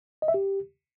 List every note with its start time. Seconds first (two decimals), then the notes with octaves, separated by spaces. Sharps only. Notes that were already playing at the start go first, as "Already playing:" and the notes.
0.22 D#5
0.28 E5
0.34 G4